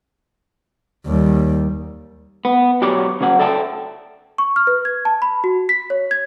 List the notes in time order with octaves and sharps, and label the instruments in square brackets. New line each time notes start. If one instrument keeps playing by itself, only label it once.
[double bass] D#2 G3
[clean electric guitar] B3
B1 F#3 G4 B4 C#5 D5
C#3 F#3 C#4 F#5
A4 D5 E5 G5 A5
[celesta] C#6
F6
B4
G#6
A5
B5
F#4
B6
C#5
G#6